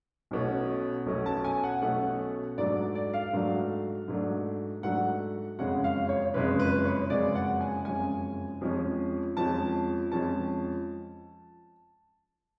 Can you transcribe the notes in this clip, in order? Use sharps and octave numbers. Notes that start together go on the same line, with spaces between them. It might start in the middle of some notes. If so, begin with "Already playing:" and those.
B1 B2 A3 C#4
B1 B2 A3 C#4
A5
G#5
F#5
B1 B2 A3 C#4 F#5
G#2 F#3 A3 D4 D5
D5
F5
G#2 F#3 A3 D4
G#2 F#3 A3 D4
G#2 F#3 A3 D4 F#5
F#1 F2 C#3 G#3 C#4 F#5
F5
C#5
F#1 F2 C#3 G#3 C#4 B4
B4
C#5
F#1 F2 C#3 G#3 C#4 D5
F#5
G#5
F#1 F2 C#3 G#3 C#4 G#5
F2 F3 G#3 C#4
F2 F3 G#3 C#4 A5
F2 F3 G#3 C#4 A5